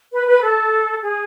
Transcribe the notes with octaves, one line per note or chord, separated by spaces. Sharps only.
B4
B4
A4
G#4